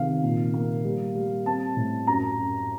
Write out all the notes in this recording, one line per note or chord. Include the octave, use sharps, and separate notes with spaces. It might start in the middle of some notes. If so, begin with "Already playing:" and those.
Already playing: C3 D#3 F5
A#2
A#3
G3
G3
C4 A5
A2
F#2 A#5
F#2